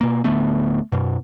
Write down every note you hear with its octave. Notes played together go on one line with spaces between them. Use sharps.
B2 A#3
D1 D3 A3 B3
F#2 B2